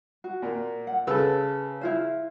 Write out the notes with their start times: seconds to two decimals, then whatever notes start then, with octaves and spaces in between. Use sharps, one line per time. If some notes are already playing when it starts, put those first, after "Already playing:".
0.24 F#4
0.42 A#2 A#3
0.87 F#5
1.07 C#3 A4 B4 E6
1.81 E4 F4 C5